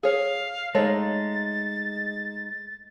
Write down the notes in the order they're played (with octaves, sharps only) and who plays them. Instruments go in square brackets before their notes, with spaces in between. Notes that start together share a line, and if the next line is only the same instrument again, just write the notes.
[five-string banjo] G#4 C#5 [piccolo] F5
[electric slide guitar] G#3 D#4 [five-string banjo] A3 C#5 F5 [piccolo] A6